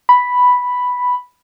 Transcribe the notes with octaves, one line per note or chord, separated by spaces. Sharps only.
B5